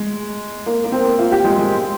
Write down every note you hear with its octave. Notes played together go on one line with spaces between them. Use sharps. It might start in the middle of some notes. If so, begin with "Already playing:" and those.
Already playing: G#3
A#3
A#3
C4
F4
G4
G#3
G#3